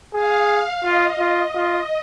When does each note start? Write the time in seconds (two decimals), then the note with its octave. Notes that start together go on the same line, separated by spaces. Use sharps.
0.14 G#4 F5
0.49 F5
0.84 F4 D#5
1.19 F4
1.56 F4